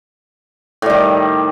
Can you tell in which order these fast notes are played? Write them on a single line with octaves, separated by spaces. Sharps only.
A2 G3 D#3